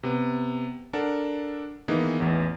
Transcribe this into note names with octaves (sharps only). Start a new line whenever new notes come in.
C3 B3
D4 A4 A#4 F#5 A5
D#3 E3 A#3 B3 D#4 G#4
A1 E2 E3